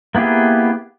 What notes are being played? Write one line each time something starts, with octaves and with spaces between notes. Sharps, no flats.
A#3 B3 E4 G4 G#4